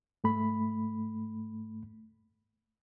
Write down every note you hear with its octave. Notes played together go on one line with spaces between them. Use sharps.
G#2 A3 B5